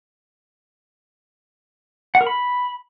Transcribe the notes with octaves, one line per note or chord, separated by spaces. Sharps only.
F#5
A#4
B5